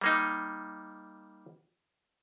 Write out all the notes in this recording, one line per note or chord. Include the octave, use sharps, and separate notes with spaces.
G3 A#3 D#4